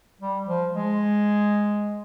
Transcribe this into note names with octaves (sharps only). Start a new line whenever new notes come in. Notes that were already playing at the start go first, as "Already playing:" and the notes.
G3
F3
G#3